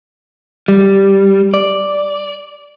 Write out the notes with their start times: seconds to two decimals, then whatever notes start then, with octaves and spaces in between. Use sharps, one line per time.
0.68 G3
1.54 D5